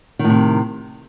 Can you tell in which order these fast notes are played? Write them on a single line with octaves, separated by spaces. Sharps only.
D#3 A2 C3